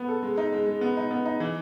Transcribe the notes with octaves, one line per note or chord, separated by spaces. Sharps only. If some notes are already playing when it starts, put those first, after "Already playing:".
Already playing: B3
A4
G#3
D#4
G#3
G#3
B3
D#4
B3
D#4
E3